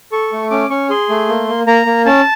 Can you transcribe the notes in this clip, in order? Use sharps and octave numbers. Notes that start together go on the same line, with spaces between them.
A4 C#6
A3
C#4 D6
C#4 C#6
G#4 C6
A3
A#3
A#3
A#3 A#5
A#3
C#4 A5